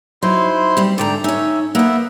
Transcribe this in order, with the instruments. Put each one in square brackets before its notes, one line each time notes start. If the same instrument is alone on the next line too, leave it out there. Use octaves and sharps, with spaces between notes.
[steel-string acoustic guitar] F#3 D#4 [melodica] E4 C5 C6
[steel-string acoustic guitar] G3 C4
[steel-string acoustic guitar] G#2 D3 A#5 [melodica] D5 G5
[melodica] C#4 E5 [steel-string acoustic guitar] D#4 C#5
[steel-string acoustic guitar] A#3 C5 [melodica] B3 E5 F#5